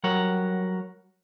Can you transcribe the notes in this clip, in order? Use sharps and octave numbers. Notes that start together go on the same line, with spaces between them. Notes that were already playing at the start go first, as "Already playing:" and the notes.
F#3 G3 A#4 C#5 F#5